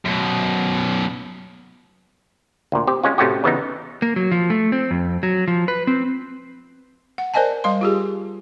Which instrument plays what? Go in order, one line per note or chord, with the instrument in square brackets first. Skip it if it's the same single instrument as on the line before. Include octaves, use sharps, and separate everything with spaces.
[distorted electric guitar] F#2 B2
[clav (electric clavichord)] D2 A#2
C4 G4
G#3 C#4 F4
A2 C3 A3 C#4 F#4 G4
C#3 E3 B3 D#4
[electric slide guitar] A#3
F#3
F3
A3
C4
F2
F#3
F3
B4
C4
[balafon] F#5
A#4 C5 D5 D#5 G#5 A5
G3 F5 C6
F4 G4 G#4